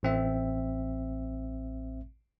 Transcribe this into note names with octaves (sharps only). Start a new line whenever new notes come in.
A1 C4 E5